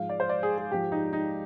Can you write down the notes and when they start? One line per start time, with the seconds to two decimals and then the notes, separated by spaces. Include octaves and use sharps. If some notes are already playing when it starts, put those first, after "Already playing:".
Already playing: G#2 F3 F5
0.10 D5
0.20 C5
0.29 D5
0.43 G#4
0.58 G#4
0.72 G#2 F3 G4
0.92 D#4
1.13 D#4